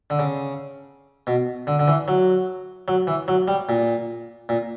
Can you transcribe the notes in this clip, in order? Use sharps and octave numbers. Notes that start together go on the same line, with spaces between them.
D3
C#3
B2
D3
D3
E3
F#3
F#3
E3
F#3
G3
A#2
A#2